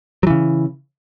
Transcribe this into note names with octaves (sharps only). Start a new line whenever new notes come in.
C#3 E3 F#3